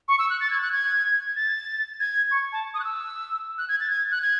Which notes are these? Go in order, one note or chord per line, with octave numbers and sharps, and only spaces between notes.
C#6
E6
F#6
A6
G#6
F#6
G#6
A6
G#6
C#6
A5
D#6
F#6
E6
F#6
G#6
A6
G#6
F#6
G#6